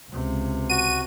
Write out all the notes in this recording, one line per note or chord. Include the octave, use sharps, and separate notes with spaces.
C#2 C3
F#4 D#7